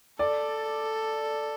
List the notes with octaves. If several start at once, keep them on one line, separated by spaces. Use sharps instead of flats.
A4 D5